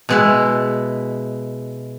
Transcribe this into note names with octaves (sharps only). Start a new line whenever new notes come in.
B2 G#3 E4